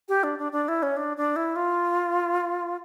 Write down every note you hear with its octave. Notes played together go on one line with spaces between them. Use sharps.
G4
D4
D4
D4
E4
C#4
D4
D4
E4
F4